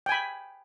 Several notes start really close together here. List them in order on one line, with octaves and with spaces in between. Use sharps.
G5 G#5 B5